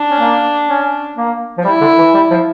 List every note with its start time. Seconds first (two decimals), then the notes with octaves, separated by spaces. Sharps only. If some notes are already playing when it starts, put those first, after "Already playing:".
Already playing: D4
0.11 C#4
0.20 A#3
0.68 C#4
1.16 A#3
1.58 F3
1.65 G3 E4
1.81 D3
1.98 E3
2.14 G3
2.31 F3